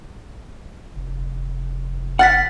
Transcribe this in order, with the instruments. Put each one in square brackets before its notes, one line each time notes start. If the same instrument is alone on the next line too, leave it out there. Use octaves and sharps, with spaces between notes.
[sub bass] F1
[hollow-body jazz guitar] F#5 [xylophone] F6 A6 B6